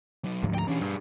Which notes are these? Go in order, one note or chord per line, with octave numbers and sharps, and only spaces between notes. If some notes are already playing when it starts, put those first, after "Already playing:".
F#3 D#4
D2 G#2 F3
G5 A#5
E3 C#4 D4 G#4
G2